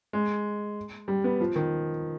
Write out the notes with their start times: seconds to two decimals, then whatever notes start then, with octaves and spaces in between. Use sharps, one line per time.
0.13 G#3
1.08 G3
1.24 B3
1.40 F3
1.56 D#3